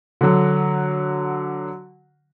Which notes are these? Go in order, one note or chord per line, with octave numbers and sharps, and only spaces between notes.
D3 F#3